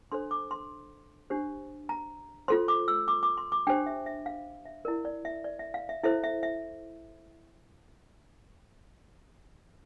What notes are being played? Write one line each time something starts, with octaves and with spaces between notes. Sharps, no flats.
D4 A4 C5 C6
D6
C6
D4 G4 C5
A#5
F4 A4 C5 C6
D6
E6
D6
D6
C6
D6
D4 G4 C5 G5
E5
E5
F5
E5
E4 A#4 D5
D5
E5
D5
E5
F5
E5
E4 A4 C5 E5
E5
E5